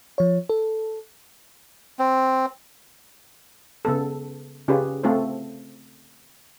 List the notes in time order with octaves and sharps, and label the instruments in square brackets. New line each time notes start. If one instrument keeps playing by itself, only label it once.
[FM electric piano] F3 C#5
A4
[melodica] C4
[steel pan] C#3 B3 A4
C#3 C#4 F4 G4 G#4 B4
A3 C4 F4 A4 C5